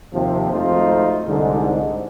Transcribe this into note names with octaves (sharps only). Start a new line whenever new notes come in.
D#2 C3 F3
G#1 F2 A3 D#4 F4 C5
C2 G#2 D3